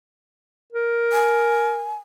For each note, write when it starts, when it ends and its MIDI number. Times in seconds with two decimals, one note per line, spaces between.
0.72 1.98 70
1.12 1.95 80